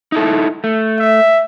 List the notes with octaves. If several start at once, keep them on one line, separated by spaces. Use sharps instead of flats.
D#4 E4 A4
A3
E5